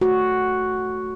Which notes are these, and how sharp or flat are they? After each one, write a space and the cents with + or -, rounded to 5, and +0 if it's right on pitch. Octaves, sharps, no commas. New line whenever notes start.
A3 +0 F#4 +0